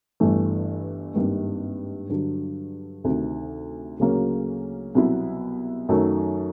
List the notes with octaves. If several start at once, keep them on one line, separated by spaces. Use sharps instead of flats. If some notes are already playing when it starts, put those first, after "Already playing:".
G1 G2 E3 A3
G#1 G2 D#3 G3 A#3
G2 D3 F#3
D2 C3 D#3
D2 C#3 F#3 A#3 C#4
C2 B2 F#3 B3 E4
F#2 D#3 F#3 A3